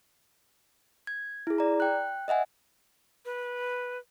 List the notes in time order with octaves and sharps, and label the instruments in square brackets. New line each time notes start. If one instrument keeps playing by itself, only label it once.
[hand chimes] G#6
E4 G#4
D5 A#5
G5 F#6
D#5 E5 F#5 G#5
[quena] B4